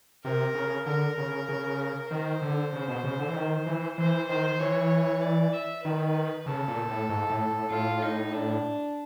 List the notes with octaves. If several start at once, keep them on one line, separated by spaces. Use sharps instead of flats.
C3 A#4
C#3
D3 A#4
C#3
C#3
D#3 C5
D3
C#3
B2
C#3
D3
E3
D#3
E3
E3 C5
D#3 C5
E3 C#5
D5
E5
D#3 B4
C#3 A4
A#2
A2
G#2
A2
A2
A2 F4
D#4
D4